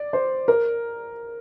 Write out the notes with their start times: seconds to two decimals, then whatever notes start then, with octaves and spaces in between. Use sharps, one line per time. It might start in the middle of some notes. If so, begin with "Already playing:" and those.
Already playing: D5
0.13 C5
0.48 A#4